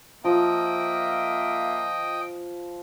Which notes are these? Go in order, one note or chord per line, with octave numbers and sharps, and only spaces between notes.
F3 A#3 D#5 E5 G5